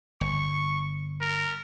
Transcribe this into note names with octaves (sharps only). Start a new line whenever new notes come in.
G1 C#6
A#4